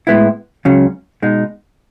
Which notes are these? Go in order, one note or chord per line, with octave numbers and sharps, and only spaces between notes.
A2 G#3 B3 E4
C#2 C#3 F#3 C#4
B2 G#3 D#4